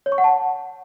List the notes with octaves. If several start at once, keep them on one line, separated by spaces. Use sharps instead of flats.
C#5
C#6
F#5
A5